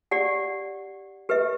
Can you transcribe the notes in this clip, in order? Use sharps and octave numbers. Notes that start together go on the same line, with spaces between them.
G4 D5 F#5
G4 B4 E5